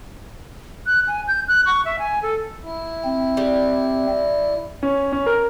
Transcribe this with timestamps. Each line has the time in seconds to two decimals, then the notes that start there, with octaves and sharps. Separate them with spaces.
0.87 F#6
1.07 G#5
1.28 G6
1.48 F#6
1.66 C#6
1.85 E5
1.99 G#5
2.23 A4
2.63 E4
3.04 C4
3.37 G3
4.83 C#4
5.12 C#4
5.26 A#4